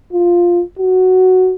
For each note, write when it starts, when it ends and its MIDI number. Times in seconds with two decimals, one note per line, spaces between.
0.13 0.62 65
0.79 1.55 66